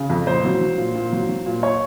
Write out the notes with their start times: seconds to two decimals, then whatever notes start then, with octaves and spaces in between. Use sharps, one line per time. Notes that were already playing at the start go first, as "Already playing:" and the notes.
Already playing: C#3
0.10 F2
0.27 A#2 C5
0.45 F#3
0.61 F#3
0.78 A#2
0.95 A#2
1.13 F#3
1.29 F#3
1.46 A#2
1.63 C#5